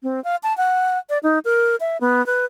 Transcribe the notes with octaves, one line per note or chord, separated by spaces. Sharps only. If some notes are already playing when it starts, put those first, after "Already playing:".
C4
F5
A5
F#5
D5
D#4
A#4
E5
B3
B4